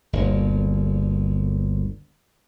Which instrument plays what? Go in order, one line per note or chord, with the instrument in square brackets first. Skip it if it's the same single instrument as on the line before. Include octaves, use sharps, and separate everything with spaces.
[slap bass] G1 D2 A#2